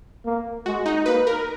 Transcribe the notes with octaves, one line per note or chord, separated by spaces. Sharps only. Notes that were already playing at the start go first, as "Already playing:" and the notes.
A#3
G#3 F#4
D#4
A#3 B4
A#4